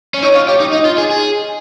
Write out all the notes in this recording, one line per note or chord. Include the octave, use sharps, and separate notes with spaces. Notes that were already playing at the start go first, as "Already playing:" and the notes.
C#4
D#4 C#5
F4
G4
D#4
D#4 D#5
F4
G#4
G#4